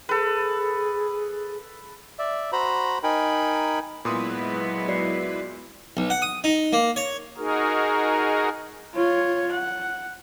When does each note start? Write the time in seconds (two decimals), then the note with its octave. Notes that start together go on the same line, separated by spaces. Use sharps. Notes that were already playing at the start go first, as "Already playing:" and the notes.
0.09 G#4 A4 B4
2.19 D5 E5
2.52 F#4 C5 A#5 B5
3.03 D#4 A#4 G5 G#5 B5
4.05 A#2 F#3 G#3 B3 E4 B4 C6 D#6
4.88 F#4 D5 C7
5.97 B1
6.10 F#5
6.22 D#6
6.44 D#4
6.73 A#3
6.96 C#5
7.37 D#4 F#4 G#4 A#4
8.95 F4 C#5
9.52 F#5